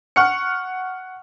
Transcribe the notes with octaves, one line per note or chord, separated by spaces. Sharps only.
F#5 C#6 F6 C#7